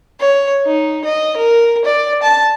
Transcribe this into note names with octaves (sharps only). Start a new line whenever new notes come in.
C#5
D#4
D#5
A#4
D5
A5